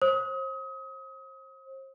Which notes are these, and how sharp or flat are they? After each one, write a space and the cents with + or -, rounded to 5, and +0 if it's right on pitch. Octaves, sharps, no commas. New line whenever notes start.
C5 +35 D#6 +35